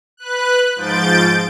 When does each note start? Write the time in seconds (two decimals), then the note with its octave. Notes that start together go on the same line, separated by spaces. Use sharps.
0.17 B4 F#6
0.76 G#2 F3 G6 A6 D7